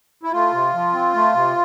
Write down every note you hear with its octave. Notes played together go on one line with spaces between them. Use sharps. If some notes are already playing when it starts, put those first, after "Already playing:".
E4
A3 F4
C3
F3
C4
A3
C3